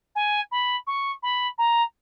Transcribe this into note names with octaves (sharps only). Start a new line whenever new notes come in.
G#5
B5
C#6
B5
A#5